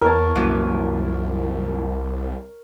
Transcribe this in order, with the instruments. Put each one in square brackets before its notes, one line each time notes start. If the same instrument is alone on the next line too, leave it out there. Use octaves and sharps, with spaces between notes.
[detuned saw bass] E2 [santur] A#4 C#5 A5
[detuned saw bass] C2 [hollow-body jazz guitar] F#2 A#2 E3